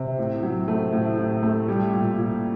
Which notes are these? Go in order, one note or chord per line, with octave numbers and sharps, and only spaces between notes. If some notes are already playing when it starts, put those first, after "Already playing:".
Already playing: C3
A2
F#3
A3
A2
A2
A3
G3
A#2
A#2